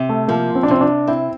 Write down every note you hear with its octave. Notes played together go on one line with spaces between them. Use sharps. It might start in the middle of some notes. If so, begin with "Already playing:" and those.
Already playing: C3
A3
F3 A#3
C4
D4
C3 C4
D4
C4 E4